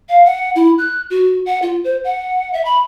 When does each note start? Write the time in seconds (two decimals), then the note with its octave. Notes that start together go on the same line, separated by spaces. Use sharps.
0.09 F5
0.25 F#5
0.56 E4
0.78 F#6
1.10 F#4
1.46 F#5
1.62 F4
1.84 C5
2.04 F#5
2.53 E5
2.65 B5